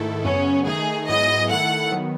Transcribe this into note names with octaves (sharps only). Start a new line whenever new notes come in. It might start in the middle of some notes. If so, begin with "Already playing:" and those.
Already playing: G#2 D#3 A3 E4 A4
F#2 C#3 F#3 B3 C#4
D#3 A3 D#4 G#4
G#2 F#3 B3 E4 G#4 D#5
D#3 A3 E4 A4 F#5
D#3 F#3 B3